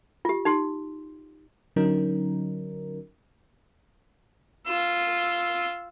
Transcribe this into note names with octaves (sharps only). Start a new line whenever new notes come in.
F4 G4
D#4 G4 C6
D3 F#3 C#4 D#4 A#4
F4 E6